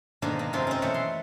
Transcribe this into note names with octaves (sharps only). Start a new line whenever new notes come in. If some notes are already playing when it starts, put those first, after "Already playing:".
G#2 B2 D3 D#3 A#3 D4
A#3
F#2 C3 G#3 D#4 F4
C4 C#4
B2 E3 A3 E5 F#5
C6